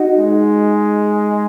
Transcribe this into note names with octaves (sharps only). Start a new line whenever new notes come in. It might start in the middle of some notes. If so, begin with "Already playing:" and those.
Already playing: D#4 F#4
G#3